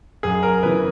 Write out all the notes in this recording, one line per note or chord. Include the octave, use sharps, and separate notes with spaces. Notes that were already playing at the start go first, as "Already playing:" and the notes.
F#2 G#4
A#4
C#3 E3 B4